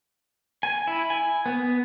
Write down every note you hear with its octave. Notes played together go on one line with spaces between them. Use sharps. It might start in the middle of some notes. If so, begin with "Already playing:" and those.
G#5
E4
G#5
B3